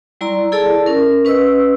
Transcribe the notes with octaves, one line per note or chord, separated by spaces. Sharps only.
G3 E4 D5 A#5 C6
E4 G#4 A4 D5 A5
C#4 A#4
C#4 B4 D#5 E6